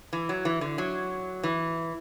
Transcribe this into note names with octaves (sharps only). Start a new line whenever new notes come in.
E3
F#3
E3
D3
F#3
E3